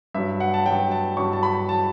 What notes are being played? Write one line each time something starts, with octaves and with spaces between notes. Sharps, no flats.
G2 F#3 E5
F#5
A5
G2 F#3 G5
A5
G2 F#3 C#6
A5
B5
F#3 A5